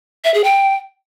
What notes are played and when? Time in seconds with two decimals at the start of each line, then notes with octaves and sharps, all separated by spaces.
0.24 E5
0.34 G#4
0.44 G5